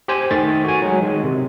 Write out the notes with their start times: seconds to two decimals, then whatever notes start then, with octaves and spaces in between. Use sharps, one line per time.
0.08 G4 C5 G#5
0.31 D#3 A3 E5 A6
0.65 F#4 G#5
0.82 F#3 G#3
1.03 D#3 G#3
1.24 C3